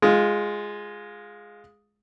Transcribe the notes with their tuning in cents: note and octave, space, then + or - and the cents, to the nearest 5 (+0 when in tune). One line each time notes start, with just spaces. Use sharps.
G#3 +0 F4 +15